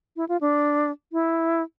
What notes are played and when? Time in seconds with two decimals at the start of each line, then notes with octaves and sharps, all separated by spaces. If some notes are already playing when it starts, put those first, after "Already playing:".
0.16 E4
0.29 F4
0.41 D4
1.12 E4